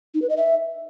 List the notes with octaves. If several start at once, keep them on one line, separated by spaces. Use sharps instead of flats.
D#4
B4
D#5
E5